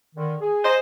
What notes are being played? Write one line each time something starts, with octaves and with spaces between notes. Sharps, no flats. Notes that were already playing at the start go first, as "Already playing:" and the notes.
D3 D#3
G#4
C5 D#5